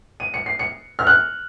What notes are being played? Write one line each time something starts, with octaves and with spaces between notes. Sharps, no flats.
D#7
C#7
C7
C#7
F6
F#6